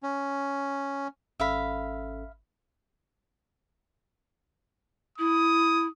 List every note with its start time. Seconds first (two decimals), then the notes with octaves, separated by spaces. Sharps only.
0.03 C#4
1.40 G#1 C#4 A4 E5 F5 B5
5.18 E4 D#6